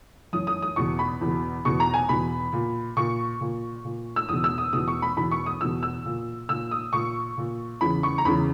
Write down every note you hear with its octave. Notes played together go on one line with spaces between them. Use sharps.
F#2 E3 D#6
D#6
D#6
E2 B2 C#6
B5
E2 B2
E2 B2 C#6
A#5
G#5
E2 B2 B5
A#2
A#2 C#6
A#2
A#2
E6
E2 B2 D#6
E6
D#6
E2 B2 D#6
C#6
B5
E2 B2 B5
C#6
D#6
E2 B2 E6
E6
A#2
A#2 E6
D#6
A#2 C#6
A#2
E2 C#3 E3 B5
C#6
A#5
E2 C#3 E3 B5